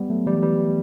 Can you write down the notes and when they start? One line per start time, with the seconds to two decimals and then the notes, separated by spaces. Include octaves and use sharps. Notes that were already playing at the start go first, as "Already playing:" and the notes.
Already playing: G3 B3
0.10 F#3 A3
0.26 E3 G3
0.43 E3 G3